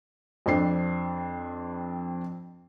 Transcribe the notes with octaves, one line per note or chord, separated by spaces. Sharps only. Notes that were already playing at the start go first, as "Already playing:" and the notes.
F2 C4 D4 C7